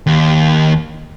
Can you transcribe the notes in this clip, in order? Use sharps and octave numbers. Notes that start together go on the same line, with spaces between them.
D#2